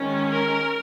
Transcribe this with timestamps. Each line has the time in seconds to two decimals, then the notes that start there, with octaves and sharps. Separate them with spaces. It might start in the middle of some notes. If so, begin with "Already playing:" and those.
Already playing: D#3 G#3 C#4
0.31 A#4